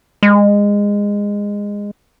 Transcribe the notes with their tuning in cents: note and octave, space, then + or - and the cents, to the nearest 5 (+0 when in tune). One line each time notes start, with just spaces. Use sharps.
G#3 -20